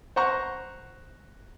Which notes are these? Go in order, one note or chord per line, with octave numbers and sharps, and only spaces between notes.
C5 F#5 A#5 C#6